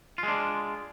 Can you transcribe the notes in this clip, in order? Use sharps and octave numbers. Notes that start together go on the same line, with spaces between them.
G#3 D4 F4